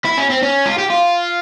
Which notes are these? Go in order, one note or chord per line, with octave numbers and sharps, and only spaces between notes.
E4
C#4
C4
C#4
F4
G4
F4